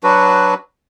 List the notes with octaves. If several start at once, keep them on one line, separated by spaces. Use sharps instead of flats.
F#3 D4 F#4 B4